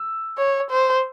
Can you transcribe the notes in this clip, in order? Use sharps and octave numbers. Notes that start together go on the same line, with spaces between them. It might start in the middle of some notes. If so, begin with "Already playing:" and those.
Already playing: E6
C#5
C5